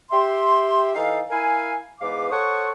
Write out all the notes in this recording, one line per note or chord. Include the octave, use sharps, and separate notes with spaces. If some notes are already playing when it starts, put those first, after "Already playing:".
G4 E5 C6
E3 D#4 A4 F5
E4 A#4 F5 G#5
E2 G#2 B4 F5 D6
A4 C5 C#5 F#5 C#6 D#6